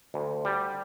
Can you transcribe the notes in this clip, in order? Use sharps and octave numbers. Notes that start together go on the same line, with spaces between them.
D2
G3